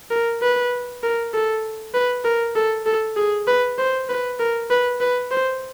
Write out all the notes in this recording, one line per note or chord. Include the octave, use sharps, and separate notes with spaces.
A#4
B4
A#4
A4
B4
A#4
A4
A4
G#4
B4
C5
B4
A#4
B4
B4
C5